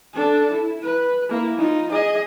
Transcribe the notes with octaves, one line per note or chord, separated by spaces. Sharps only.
D4 A4
E4
B4
A#3 E4
D#4 F4
G#4 D#5